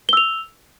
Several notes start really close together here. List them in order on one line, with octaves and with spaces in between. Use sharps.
G7 E6 F7